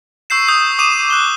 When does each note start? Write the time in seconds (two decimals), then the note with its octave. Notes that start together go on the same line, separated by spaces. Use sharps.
0.30 C#6 E6 G6 C7 E7
0.48 D#6 G6
0.79 D6 D#6 D#7 E7
1.10 F#6 G7